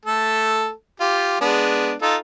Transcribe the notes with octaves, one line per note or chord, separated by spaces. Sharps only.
A3 A4
F4 G4
G#3 B3 D4
D#4 F4 A4